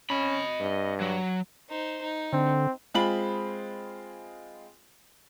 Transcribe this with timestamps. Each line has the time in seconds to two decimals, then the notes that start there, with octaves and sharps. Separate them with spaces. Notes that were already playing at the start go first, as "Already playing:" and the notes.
0.10 C#4 D#5 B5
0.60 G2
1.00 F#3
1.69 D#4 C5
2.01 D#4
2.33 D3 C4
2.94 G#3 C4 F4 G#4 B5 F#7